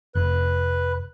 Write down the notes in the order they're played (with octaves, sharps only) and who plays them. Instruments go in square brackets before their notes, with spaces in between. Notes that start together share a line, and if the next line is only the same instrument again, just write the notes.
[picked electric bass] F1 [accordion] B4 F#6